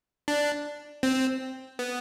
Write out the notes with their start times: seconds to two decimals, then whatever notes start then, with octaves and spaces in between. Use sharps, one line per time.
0.28 D4
1.03 C4
1.79 B3